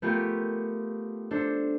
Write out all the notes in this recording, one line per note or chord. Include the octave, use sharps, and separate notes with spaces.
A3 B3 F4 G4 A#4
D4 A4 C5